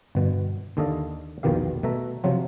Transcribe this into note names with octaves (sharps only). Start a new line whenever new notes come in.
G1 B2
D#2 D3 A4 D5 D#5 F5
A#1 E2 B2 D#3 G4 F5
B2 A3 E5 A#5
C3 F3 F#3 F4